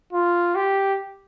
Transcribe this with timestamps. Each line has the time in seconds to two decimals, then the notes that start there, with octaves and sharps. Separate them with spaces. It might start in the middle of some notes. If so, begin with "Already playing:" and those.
0.13 F4
0.55 G4